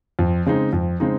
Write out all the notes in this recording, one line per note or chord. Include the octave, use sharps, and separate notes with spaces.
F2
C#3 G#3 C4 D#4
F2
C#3 G#3 C4 D#4